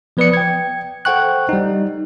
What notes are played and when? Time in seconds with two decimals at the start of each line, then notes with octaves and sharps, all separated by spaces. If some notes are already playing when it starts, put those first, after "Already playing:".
0.17 F3 B3 B4 D5 D#6 C#7
0.33 G5 G#6
1.05 A4 C5 F#5 G5 C#6 F#6
1.49 G3 D#4